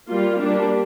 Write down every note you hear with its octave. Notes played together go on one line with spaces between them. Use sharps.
G3 A#3 F4
G3 A#3 D4